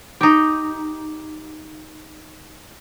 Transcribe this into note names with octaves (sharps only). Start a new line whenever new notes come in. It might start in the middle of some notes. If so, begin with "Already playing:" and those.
D#4 G4